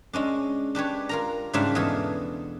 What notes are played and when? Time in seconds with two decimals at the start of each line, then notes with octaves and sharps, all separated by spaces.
0.13 G#3 C#4 D4
0.75 D4 G4 B4 C#5
1.09 F4 A#4 A#5
1.53 G#2 C#3 G3 D4 F4 E5
1.75 E2 B2 G#4 A4